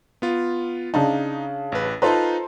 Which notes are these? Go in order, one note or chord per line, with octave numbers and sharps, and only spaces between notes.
B3 F4
C#3 D4 D#4 A5
A1 B4
D#4 F4 A4 B4 C5 A#5